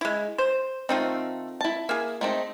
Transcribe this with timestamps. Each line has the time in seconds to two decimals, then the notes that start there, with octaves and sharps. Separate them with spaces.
0.01 G#3 E4
0.38 C5
0.89 D#3 A3 C4 D#4 F4
1.61 E4 A5
1.89 A#3 G#4
2.21 A3 C4 D#4